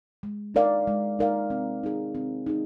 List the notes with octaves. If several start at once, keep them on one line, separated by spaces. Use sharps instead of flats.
G#3
D#4 A#4 D5 F5
G#3
D#4 A#4 D5 F5
C4
D#4 G#4
C4
D#4 G#4